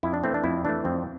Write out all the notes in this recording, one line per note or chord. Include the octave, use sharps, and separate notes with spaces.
F2 E4
D4
E3 A3 C4
D4
F2 E4
E3 A3 D4
F2 C4